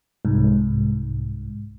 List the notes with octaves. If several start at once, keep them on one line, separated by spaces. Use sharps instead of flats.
C2 G#2